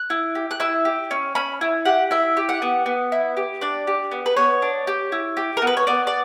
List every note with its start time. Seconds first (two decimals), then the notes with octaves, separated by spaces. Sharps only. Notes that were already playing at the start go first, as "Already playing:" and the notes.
Already playing: F#6
0.10 E4
0.35 G4
0.51 F#6
0.60 E4 E6
0.85 G4
1.11 C#4
1.35 C#4 B5
1.61 E4
1.85 G4 F#5
2.11 E4 E5
2.37 G4
2.49 F#5
2.62 B3
2.86 B3
3.12 E4
3.37 G4
3.61 D4 D5
3.87 G4
4.11 B3
4.26 B4
4.37 B3 C#5
4.62 D4
4.87 G4
5.12 E4
5.37 G4
5.57 A#4
5.62 B3
5.67 B4
5.77 C#5
5.87 B3 D5
6.07 D5